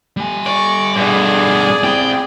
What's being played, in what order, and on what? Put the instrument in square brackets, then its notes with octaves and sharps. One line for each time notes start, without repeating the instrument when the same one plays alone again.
[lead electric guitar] G3 G#5
[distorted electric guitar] D5 [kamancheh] C#6
[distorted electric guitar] G2 B2 [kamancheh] G#4 D5
[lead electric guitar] C4 E4 [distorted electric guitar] G5